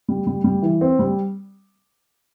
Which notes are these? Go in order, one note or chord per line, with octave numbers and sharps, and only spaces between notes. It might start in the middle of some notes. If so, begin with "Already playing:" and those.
G3
G3
G3
E3
C4
G3